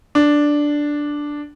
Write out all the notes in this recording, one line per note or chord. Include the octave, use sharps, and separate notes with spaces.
D4